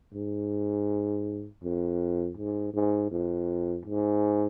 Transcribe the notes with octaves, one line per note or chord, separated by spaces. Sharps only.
G#2
F2
G#2
G#2
F2
G#2